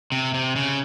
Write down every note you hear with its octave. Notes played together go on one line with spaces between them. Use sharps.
C3
C3
C#3